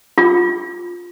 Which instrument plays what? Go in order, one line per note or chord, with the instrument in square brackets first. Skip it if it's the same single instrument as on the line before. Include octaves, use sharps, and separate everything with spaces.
[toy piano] F4